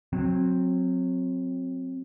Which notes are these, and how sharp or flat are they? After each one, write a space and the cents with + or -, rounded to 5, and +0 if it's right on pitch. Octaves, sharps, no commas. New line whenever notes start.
F#3 -20 C4 +5